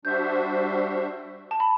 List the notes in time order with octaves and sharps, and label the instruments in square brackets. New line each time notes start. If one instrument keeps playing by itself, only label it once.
[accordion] G3 D4 F#4 C5 E5 [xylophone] G6
[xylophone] A5
B5